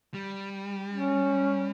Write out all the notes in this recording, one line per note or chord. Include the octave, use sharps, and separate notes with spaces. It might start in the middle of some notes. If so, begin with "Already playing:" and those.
G3
C#4